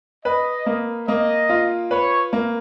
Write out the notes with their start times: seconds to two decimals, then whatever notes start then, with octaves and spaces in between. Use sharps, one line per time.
0.24 B4 D#5
0.66 A#3
1.08 A#3 D#5
1.49 F4
1.91 B4 C#5
2.33 A#3